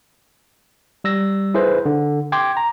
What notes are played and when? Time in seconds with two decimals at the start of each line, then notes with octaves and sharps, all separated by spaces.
1.04 G3 E6 A#6
1.54 E4 G#4 B4 C5
1.86 D3
2.32 G5 C6 D6 G#6
2.57 A#5